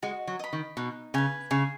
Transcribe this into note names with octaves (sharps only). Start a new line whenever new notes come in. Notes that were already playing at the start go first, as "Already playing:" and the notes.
G#3 F#4
F#3
D#5 B5
D#3
B2 D#4
C#3 B4 G#5
C#3 G#4